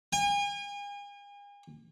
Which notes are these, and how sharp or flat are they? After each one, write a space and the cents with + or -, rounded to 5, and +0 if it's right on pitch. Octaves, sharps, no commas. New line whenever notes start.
G#5 -40